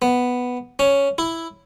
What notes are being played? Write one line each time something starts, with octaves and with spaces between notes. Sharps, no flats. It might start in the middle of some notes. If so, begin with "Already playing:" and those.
B3
C#4
E4